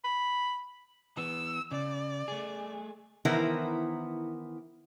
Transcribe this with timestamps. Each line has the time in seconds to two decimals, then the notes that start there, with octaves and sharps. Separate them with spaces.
0.04 B5
1.17 E3 B3 E6
1.71 C#3 D5
2.28 A3 G#4
3.25 D#3 E3 B3 E4 A#4 C5